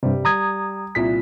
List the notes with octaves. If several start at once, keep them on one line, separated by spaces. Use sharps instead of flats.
G2 C3 G3
A#5 D#6 G#6
C2 A#2 B6